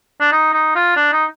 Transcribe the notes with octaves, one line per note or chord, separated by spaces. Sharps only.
D4
D#4
D#4
F4
D4
D#4